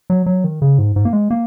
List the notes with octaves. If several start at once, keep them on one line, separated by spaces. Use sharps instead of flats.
F#3
F#3
D#3
C#3
G#2
G#2
A#3
G#3
A#3